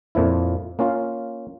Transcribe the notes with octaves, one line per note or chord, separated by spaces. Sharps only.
F2 A#2 F3 E4
A#3 C#4 F4 F5